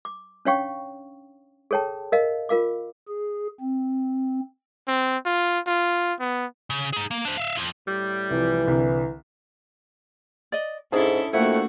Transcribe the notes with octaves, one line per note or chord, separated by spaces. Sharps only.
D6
C#4 D4 C#5 F5 G5 C#6
G#4 A4 C#5 G5 A5
A#4 D#5 F5
F4 A#4 F5 D6
G#4
C4
C4
F4
F4
B3
C#3
D#4 G#4
A#3
D4 C5
E5 F5
F2 F3
A2 G3
C2 E3 F3
C2 D3
D5 D#5
G#2 C#4 D4 E4 G#4 A4 A5
F2 A3 A#3 D4 E4 F#4 E5 F#5